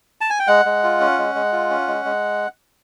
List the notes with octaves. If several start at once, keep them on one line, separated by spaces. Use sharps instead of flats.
A5
G#5
G5
G#3 F#5
G#3
F4
C#4
G#3
G#3
F4
C#4
G#3
G#3